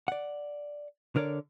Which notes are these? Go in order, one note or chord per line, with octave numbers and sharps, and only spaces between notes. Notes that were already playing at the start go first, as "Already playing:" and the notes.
D5 F#5
D3 A#4 C#5 D5